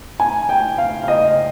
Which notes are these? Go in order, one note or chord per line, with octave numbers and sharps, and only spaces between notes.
G#5
G5
F5
F5
D#5